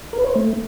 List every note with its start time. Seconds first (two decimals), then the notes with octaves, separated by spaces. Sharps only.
0.13 A#4
0.19 B4
0.24 C#5
0.30 C5
0.36 A3